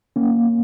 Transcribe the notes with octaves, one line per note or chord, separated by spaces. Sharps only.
A#3 C#4